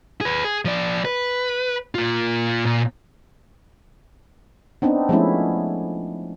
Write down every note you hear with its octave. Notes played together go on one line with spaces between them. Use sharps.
G#4 B4
G#4
F3 D5
B4
A#3 F4
A#2
B3 C4 D4 D#4
F3 G#3 A3 B3 C#4 E4